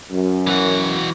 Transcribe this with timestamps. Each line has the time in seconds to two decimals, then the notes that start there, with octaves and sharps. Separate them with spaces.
0.11 F#2
0.47 E3 F#4